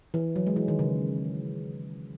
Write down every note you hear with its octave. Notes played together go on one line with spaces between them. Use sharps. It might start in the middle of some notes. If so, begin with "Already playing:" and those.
E3
F#3
G#3
E3
D#3
C#3